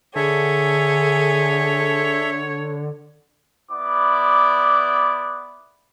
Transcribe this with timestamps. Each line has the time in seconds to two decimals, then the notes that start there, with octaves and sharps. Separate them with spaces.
0.16 D3 G#4 A4 C#5 E5
3.72 B3 E4 D5 D6